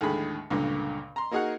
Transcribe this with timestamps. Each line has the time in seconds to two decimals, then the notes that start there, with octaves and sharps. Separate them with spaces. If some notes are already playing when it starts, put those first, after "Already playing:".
0.01 D#2 A2 D3 G#3 G#4 B5
0.50 C#2 G2 A#2 D3
1.16 A#5 C6
1.31 A#3 D#4 F#4 G#4 A#4 F#5